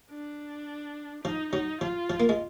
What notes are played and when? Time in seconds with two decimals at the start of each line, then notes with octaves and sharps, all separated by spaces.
0.11 D4
1.24 F3 D#4
1.53 F#3 D#4
1.81 F3 F4
2.10 F3
2.20 A#3
2.29 G#3